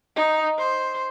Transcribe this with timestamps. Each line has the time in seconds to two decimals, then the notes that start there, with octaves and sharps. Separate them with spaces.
0.16 D#4
0.58 C5